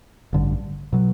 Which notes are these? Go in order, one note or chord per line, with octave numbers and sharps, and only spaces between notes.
A1 G2 D3
B2 F#3